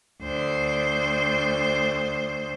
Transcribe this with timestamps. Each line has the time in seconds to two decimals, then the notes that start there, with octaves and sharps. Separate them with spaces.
0.22 D2 C5